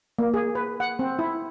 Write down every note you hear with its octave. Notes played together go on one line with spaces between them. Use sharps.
A#3
G#4
B4
F#5
C4
E4